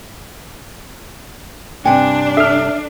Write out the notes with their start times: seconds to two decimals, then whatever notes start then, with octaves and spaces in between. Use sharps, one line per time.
1.85 G2 C3 D4 G5 G#5
2.37 A4 E5 F6